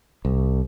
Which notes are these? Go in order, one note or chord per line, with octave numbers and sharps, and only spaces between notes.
C2